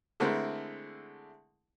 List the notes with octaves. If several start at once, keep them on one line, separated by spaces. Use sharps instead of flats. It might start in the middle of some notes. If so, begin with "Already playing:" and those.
D3 G#3 A3 C4 E4 A#4